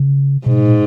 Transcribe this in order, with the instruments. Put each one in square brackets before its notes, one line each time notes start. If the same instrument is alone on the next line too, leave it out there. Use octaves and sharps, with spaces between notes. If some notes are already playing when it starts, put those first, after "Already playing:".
Already playing: [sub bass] C#3
[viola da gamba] G#2 [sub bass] B2
[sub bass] A#2